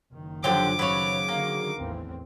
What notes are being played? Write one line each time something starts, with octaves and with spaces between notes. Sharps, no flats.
F#1 D#3
D3 F3 F#3 G4 D6
C#3 F#3 B4 C#5
D3 D#3 A#3
A1 E2 C4